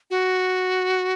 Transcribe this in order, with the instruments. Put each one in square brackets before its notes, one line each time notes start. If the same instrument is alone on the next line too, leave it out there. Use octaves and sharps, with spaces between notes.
[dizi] F#4